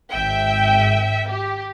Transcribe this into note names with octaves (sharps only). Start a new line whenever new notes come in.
G#1 E5 G5
G4